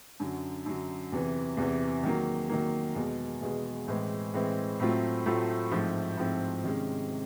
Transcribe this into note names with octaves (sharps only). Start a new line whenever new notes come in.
F#2 D3 F#3
F#2 D3 F#3
E2 C3 E3
E2 C3 E3
D#3 F#3 A#3
D#3 F#3 A#3
E2 B2 G#3
E2 B2 G#3
A2 E3 G#3 C4
A2 E3 G#3 C4
A2 F#3 A3 C4 F4
A2 F#3 A3 C4 F4
G#2 F3 A3 C4 E4
G#2 F3 A3 C4 E4
C3 D#3 G#3 C#4
C3